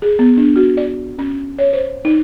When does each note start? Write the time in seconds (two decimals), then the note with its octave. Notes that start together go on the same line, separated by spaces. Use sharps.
0.02 G#4
0.19 B3
0.37 D4
0.56 F#4
0.77 D5
1.19 C#4
1.59 C#5
1.73 C5
2.05 D#4